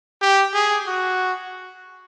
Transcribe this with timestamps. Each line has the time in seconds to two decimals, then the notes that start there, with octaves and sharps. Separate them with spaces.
0.22 G4
0.54 G#4
0.87 F#4